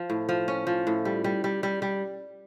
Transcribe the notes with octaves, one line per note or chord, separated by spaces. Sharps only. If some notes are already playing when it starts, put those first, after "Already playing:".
Already playing: F3
A2
F3
C#4
F3
A2
G3
G3
G3
G3
G3